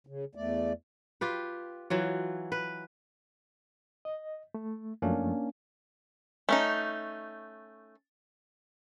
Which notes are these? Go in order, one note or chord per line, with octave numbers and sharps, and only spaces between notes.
C#3
E2 A3 D5
F4 G4 B4
E3 F#3 F4
B4
D#5
A3
F#2 F3 A3 A#3 C#4 D4
A3 C#4 D#4